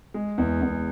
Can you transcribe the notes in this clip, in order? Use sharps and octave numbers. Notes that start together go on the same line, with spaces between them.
G#3
E2
E2